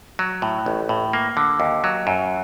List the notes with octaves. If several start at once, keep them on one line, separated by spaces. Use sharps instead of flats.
F#3
A2
A1
A2
A#3
D3
D#2
F#3
F#2